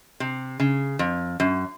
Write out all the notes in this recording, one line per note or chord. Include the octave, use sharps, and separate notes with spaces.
C3
C#3
F2
F#2